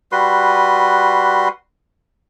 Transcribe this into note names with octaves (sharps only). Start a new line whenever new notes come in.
G3 F#4 B4 C6